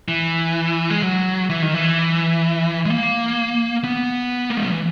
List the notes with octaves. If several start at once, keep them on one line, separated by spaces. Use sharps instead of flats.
E3
G#3
F#3
E3
D#3
E3
G#3
A#3
B3
A#3
G#3
F#3
E3